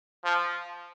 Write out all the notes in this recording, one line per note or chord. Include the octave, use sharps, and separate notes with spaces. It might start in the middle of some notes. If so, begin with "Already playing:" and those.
F3